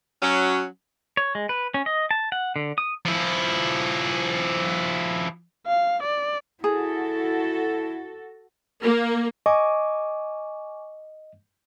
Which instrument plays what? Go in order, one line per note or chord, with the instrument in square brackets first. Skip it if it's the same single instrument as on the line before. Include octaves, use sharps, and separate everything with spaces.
[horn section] F#3 C#4
[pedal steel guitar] C#5
G#3
B4
C#4
D#5
A5
F#5
D3
D#6
[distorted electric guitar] F3 E4
[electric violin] F5
D5
[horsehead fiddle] E4 [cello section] F#4 A4 [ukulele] G#4
[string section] A#3
[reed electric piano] D#5 [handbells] G#5 C#6 D6